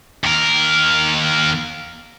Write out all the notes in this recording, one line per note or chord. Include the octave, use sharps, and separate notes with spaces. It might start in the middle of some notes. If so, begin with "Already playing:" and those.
D#2 A#4